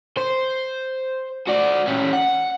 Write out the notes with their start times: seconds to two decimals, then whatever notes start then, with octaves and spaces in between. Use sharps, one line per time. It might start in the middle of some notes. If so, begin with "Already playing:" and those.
0.17 C5
1.47 F#4 D5
1.87 C#4 G4
2.13 F#5